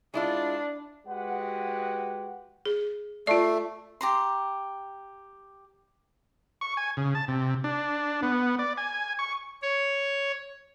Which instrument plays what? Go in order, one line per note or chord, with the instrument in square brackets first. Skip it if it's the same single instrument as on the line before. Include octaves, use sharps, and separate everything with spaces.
[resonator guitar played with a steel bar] G#3 E4 F4 [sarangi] D4
[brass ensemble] G#3 F#4 G4 B4 F#5
[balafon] G#4
[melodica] A3 [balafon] F4 D5
[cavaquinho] G4 A#5 C6
[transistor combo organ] C#6
G#5
C#3
A5
C3
D4
B3
D5
G#5
C#6
[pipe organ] C#5